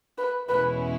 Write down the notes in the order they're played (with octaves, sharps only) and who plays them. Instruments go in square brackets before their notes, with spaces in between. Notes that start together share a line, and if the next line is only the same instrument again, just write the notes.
[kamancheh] B4
[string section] E2 B2 G#3 C#4 E4 [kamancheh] B4